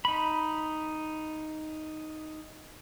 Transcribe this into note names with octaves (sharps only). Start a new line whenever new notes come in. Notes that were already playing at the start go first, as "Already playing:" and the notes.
D#4 B5